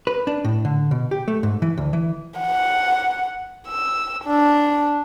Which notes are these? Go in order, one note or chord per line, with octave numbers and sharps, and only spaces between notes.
B4
D4
A2
D3
B2
G4
A3
G#2
E3
D2
E3
F#5
E6
D4